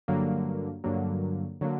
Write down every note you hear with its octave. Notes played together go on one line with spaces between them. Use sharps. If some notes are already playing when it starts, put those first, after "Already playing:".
G2 D3 F#3 A#3
G2 D3 F#3 A#3
D3 F#3 A#3